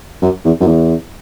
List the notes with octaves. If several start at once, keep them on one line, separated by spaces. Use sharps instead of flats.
F#2
E2
F#2
E2